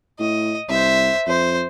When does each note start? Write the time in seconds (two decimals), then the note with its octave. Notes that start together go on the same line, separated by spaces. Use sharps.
0.19 A2 D#5
0.69 C2 C5 E5
1.27 F2 C5